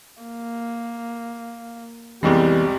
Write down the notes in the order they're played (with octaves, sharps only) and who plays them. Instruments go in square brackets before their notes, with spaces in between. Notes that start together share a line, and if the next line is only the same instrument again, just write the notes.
[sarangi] A#3
[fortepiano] C2 F2 G#3 [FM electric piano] E3 B3 [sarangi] G3